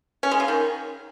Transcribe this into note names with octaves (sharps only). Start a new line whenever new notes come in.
C#4
G#3
C#3
D#3